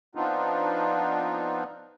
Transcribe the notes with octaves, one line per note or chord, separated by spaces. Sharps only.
F3 B3 C4 D4 D#4 F4